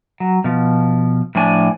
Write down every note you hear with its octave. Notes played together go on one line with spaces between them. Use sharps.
F#3
B2 F3
A2 F3 D4 G#5